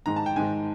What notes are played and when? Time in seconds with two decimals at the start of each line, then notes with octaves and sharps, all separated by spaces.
0.06 G#2 D#3 G#3 A#5
0.16 A5
0.26 G5
0.36 G#2 D#3 G#3 G#5